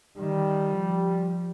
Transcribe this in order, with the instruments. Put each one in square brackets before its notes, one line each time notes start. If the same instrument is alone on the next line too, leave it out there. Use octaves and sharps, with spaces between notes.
[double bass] D#3 [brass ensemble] G3
[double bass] F3